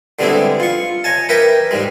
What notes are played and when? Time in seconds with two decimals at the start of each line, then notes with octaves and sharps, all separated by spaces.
0.19 D3 G3 G#3 B3 C4 E4
0.60 F4 C#6
1.04 C#5 D#5 G#5 A5
1.29 A#4 B4 D#5 E5 G5 D6
1.71 G#2 G3 G#3